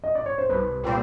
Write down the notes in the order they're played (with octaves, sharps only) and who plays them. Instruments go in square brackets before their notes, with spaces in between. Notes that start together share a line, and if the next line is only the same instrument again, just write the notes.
[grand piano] D#5
D5
C#5
C5
[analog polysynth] C2 [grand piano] B4
[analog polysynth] A#2 G3 C4